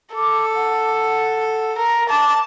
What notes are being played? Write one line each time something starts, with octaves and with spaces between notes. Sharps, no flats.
A4 D6
F#5
A#4
A5 D6